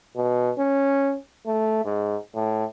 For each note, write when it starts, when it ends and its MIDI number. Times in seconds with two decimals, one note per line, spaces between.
0.16 0.52 47
0.58 1.16 61
1.47 1.83 57
1.85 2.16 44
2.35 2.64 45